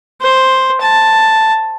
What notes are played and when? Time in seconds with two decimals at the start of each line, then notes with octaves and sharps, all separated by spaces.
0.21 C5
0.81 A5